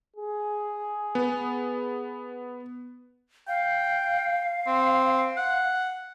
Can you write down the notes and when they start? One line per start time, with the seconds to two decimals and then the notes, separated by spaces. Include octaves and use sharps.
0.16 G#4
1.15 B3
3.48 F5 G5
4.67 C4
5.37 F#5